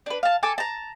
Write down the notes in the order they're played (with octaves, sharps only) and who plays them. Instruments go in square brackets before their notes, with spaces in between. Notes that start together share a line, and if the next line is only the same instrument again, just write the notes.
[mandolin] D4 B4
F5 A5
A4 G#5 A5 D6
A5 A#5